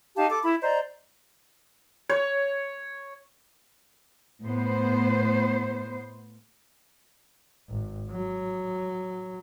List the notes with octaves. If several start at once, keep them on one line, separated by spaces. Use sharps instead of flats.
D#4 G4 F5 A5
A4 D6
E4 B5
C5 D5 D#5 A#5
C#5
A2 B3 C5
G#1
F#3